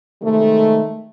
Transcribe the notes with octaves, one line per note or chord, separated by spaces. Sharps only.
C3 D#3 G#3 A3